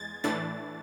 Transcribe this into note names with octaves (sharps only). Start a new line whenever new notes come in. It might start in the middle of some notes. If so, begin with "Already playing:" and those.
Already playing: E2 G#3 G#6 A6
A2 E3 A3 D4 A6